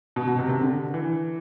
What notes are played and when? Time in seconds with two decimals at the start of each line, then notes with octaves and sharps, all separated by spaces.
0.16 B2
0.27 B2
0.39 C3
0.49 C3
0.60 D3
0.94 E3